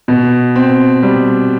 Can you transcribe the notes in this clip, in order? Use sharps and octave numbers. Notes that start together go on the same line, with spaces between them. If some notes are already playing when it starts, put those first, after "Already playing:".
B2
C4
G3